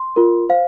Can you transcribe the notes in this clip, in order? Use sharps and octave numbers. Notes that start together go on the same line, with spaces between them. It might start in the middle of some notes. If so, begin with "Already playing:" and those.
Already playing: C6
F4 A#4
C5 F5